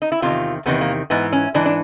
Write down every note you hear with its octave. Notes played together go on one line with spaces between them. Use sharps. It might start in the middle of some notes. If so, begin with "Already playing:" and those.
D#4
E4
E2 C3 D#3 F4
E2 C3 D#3 B3
A#3
G#2 E3 B3
C#4
G#2 E3 D4
D4